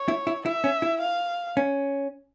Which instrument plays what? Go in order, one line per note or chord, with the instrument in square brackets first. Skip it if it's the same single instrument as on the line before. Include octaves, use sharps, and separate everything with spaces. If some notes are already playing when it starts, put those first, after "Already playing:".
Already playing: [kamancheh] C#5
[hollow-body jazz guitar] E4
E4
[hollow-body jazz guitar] E4 [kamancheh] E5
[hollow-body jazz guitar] C#4
E4
[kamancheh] F5
[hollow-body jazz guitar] C#4